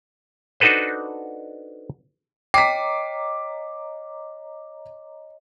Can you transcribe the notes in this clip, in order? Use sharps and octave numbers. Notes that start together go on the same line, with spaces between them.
D4 D#4 F#4 A4 B4 C5
C#5 D#5 G5 A#5 D6 B6 C7